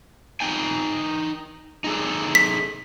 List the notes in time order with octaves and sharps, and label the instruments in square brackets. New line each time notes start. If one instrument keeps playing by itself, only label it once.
[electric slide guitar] D#4 G5 G#5
D#4 G#4 A4
[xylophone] B6